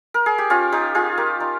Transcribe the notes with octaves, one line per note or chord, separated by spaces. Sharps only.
A#4
G#4
G4
C#4 F4
D#4 G4
F4 G#4
G4 A#4
D#4